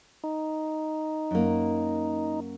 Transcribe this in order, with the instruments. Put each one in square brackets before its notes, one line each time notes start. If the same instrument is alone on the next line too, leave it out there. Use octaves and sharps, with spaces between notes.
[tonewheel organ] D#4
[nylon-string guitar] F#2 A#3